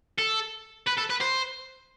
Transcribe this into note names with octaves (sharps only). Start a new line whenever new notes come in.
A4
B4
A4
B4
C5